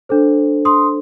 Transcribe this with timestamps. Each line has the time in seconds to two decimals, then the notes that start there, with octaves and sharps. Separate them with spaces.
0.09 D4 A4 C5
0.65 C6 D#6